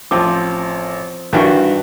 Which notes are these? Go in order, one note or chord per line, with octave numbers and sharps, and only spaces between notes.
A1 F3 C4 D6
G2 D#3 E3 G3 F#4 C#6